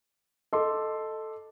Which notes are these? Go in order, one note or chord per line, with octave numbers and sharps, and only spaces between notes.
A4 D#5 C6 D6